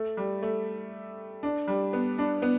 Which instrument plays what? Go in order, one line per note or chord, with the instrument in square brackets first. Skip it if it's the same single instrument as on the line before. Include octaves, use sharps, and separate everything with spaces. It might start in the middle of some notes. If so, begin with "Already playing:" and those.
Already playing: [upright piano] A3
G3
A3
D4
G3
B3
D4
B3